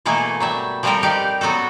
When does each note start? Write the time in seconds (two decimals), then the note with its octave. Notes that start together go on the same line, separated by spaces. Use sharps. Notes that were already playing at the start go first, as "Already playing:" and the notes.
0.06 B2 E3 A3 A#3 G#4 A4
0.40 F#3 G3 E5
0.83 F3 G3 C4 G4 A4 A#4
1.03 D#4 G4 D5 F5
1.41 F#3 B3 F#4 A4